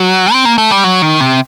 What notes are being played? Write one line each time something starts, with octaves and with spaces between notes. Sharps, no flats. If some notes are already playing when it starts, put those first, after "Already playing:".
Already playing: F#3
C4
A#3
A3
G3
F#3
D#3
C3